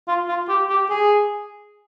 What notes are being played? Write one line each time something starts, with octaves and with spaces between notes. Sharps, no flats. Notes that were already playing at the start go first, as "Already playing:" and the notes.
F4
F4
G4
G4
G#4